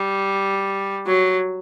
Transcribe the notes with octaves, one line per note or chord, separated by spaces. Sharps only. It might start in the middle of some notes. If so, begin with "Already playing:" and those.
Already playing: G3
F#3